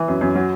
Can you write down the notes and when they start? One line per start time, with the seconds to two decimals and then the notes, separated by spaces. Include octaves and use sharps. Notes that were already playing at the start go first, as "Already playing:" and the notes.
Already playing: E3
0.08 F#2
0.21 F#2
0.35 F#3